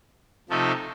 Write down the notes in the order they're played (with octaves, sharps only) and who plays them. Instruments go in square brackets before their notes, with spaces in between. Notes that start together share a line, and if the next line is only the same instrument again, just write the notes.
[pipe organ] C3 F3 A3 D#4 A4